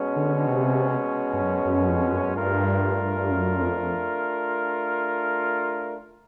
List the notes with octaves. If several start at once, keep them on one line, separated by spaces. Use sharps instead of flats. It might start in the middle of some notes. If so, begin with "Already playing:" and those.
Already playing: B2 G#3 C#4
D3
C3
G2
F#2
F#2
F2
F#2
G2 A3 D4 F4 A#4
F#2
F2